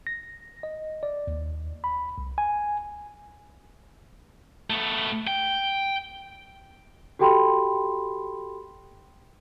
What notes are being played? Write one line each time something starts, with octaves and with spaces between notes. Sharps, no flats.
A#6
D#5
D5
D#2
B5
C2
G#5
A3 B3
G5
F#4 G4 A4 G5 B5 C6